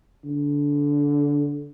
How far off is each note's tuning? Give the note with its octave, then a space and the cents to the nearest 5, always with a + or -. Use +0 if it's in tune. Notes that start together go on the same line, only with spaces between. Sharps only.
D3 -20